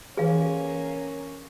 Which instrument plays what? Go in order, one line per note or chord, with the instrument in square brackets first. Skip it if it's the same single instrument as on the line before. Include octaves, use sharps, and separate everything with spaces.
[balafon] E3 B4 [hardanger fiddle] A#3 C#4 [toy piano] G#4 F5